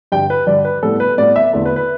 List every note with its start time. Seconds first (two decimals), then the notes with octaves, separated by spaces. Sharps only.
0.12 G2 D3 G3 D4 G5
0.30 B4
0.47 G2 D3 G3 D4 D5
0.65 B4
0.83 A2 G3 B3 A4
1.00 B4
1.18 A2 G3 B3 D5
1.36 E5
1.53 E2 D3 A3
1.65 B4
1.76 B4